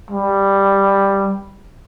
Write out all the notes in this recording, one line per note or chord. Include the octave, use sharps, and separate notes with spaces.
G3